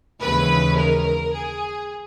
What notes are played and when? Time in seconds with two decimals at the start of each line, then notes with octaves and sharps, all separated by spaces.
0.21 D#2 C#3 E3 G#3 B4
0.77 A#4
1.32 G#4